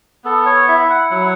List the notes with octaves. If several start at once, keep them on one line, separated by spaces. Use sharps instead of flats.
B3 A4
C#5
E4 E5
F#5
F#3